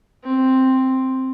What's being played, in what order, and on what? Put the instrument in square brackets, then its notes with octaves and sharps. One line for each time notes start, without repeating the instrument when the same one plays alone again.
[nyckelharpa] C4